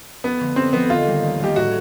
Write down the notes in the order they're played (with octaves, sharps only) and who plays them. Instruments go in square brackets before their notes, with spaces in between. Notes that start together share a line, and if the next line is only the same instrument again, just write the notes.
[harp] F2 [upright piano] B3
[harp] D3 F3 A3
[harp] F2 [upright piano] C4
[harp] D3 F3 A3 [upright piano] B3
[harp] D#2 [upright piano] F4
[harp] D#3 G3 A#3 C#4
D#2
[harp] D#3 G3 A#3 C#4 [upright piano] G4
[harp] A2 [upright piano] F#4